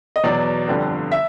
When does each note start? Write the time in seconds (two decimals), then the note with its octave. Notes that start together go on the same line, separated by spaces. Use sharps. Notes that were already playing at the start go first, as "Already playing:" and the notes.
0.16 D#5
0.24 E2 B2 F#3 D5
0.68 G1 F2 D3 G3
1.12 E5